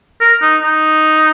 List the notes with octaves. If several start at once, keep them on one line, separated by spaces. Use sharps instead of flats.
A#4
D#4
D#4